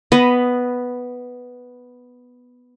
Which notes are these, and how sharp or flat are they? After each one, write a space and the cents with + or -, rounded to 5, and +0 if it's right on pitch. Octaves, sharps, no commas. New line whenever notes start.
B3 +0 D#5 +0 B5 +10